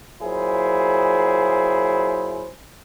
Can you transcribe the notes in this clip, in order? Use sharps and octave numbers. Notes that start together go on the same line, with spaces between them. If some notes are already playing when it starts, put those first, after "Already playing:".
A#2 F#3 E4 G#4 C5